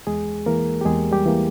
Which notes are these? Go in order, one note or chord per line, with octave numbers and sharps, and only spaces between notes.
E2 G#3 G#4
E3 A#3 A#4
G4
E2 G#3 G#4
G3 G4
E3 A#3